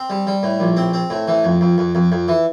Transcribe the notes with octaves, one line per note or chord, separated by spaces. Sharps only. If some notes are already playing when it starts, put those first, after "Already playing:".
Already playing: C4
G3
G3
A2
A#1
C4
C4
A2
E3
F2
F2
F2
F2
F2
E3